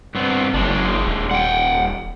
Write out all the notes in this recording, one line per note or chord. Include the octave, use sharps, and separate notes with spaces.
G2 B3 C4
F#1 G#3 D4
D#1
F#5 G5